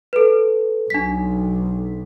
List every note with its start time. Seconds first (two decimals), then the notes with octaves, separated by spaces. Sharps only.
0.13 A4 B4
0.90 B1 D4 B6